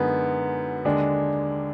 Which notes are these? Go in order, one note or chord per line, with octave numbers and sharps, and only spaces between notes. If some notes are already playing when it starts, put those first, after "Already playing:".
Already playing: F#2 D3 G#3 B3 D#4 A#4
D#2 D3 G#3 D4